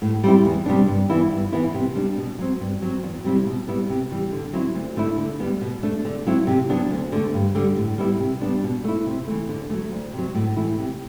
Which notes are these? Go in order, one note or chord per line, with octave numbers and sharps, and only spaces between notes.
A2
G3 C4 E4
E2
C3 G3 B3 D4
G2
E3 B3 E4
G2
E3 B3 E4
C3
G3 D4
B2
F#3 C4
G2
F#3 C4
E2
C3 G3 C4 E4
B2
G3 B3 E4
C3
E3 G3
D3
F#3 C4 E4
D2
D3 A3 E4
D3
G3 B3
B2
A3 D4
D3
F#3 C4 E4
C3
F#3 B3 D4
D2
D3 A3
G2
D3 G3
A2
G3 B3 E4
C3
G3 B3 D4
B2
A3 E4
C3
E3 A3
D3
F#3 A3
D2
C3
F#3
A2
E3 A3 E4
C3